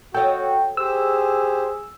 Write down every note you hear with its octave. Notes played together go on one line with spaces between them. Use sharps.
F#4 A4 C#5 D#5 G5
G4 G#4 C5 E6